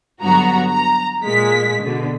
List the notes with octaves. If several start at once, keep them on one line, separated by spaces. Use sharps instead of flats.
G2 D3 F#3 B3 F#4 A#5
A#5
A#2 G#3 B6
B2 D3